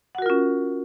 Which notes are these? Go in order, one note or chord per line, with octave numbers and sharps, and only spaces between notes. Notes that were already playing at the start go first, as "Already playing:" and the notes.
C#4 F4 F#4 A#4 F#5